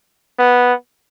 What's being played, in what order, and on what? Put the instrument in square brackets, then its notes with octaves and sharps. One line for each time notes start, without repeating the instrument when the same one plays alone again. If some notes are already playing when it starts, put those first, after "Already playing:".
[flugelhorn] B3